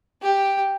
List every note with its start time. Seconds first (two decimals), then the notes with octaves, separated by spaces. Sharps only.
0.22 G4